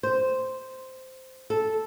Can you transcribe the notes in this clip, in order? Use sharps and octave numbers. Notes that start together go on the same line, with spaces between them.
C5
A4